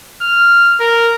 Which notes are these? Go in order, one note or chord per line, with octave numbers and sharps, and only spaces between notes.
F6
A#4